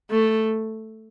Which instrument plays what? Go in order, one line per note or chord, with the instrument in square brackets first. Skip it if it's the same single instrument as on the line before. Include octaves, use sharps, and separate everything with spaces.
[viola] A3